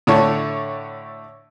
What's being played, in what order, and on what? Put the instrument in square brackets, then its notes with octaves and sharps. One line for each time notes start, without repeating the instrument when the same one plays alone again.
[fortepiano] A2 D3 A3 C#5 A5